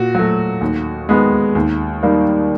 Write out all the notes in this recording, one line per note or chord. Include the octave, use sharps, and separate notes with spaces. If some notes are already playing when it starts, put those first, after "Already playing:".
Already playing: A#2 F#4
F#3 A3
D#2
D#3 G#3 B3
D#2
D#3 G3 A#3